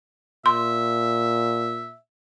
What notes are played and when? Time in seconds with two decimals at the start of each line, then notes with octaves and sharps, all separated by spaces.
0.46 A#2 E5 C6